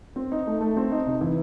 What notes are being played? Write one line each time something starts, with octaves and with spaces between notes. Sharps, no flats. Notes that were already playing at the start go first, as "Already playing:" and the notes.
C4
D#4
A3
A3
C4
D#4
C3
E3